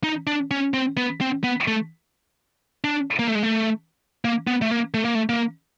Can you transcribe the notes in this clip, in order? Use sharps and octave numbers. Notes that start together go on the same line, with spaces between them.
D#4
D4
C#4
C4
B3
C4
B3
A3
D4
A#3
A3
G#3
A3
A#3
B3
A3
A#3
A3
A#3
A3
A#3